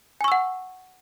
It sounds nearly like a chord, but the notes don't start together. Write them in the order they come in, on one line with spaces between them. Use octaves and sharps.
G#5 C#6 E6 F#5